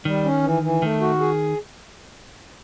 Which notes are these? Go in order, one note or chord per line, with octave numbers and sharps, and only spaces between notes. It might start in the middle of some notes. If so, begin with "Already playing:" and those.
D#3 G3
C#4
E3
E3
D#3 A3
F#4
G#4